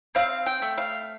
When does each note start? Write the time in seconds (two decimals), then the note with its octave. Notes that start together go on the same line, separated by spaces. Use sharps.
0.15 C4 F5
0.46 G5
0.62 A3
0.78 F5